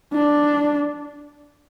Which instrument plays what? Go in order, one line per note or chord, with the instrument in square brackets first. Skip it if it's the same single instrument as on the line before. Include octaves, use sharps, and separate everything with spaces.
[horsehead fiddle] D4